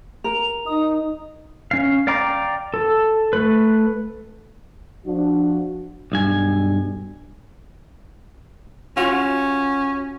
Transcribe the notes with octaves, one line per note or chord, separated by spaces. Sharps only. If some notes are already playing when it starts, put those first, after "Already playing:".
A#4 F7
D#4 D#6
C#4 F5
D5 F5 G5 A#5 D6
A4
A3 B4
F3 D4 F#4
B1 G2 G#5
C#4 F4 F#4